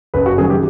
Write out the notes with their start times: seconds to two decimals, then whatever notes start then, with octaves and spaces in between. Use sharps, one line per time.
0.14 F#1 B4
0.26 F#4
0.38 F#2 D#3 G3 G#4
0.50 G4